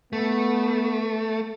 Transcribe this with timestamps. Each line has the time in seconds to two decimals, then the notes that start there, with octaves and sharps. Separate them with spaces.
0.13 A3 B3